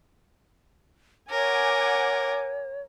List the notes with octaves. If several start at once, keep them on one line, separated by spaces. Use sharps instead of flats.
A#4 C#5 F#5 G#5 D6